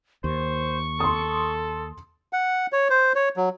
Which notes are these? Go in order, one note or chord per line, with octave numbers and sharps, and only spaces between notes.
D#2 C5 C#6
A4 C6 D#6
F#5
C#5
C5
C#5
F#3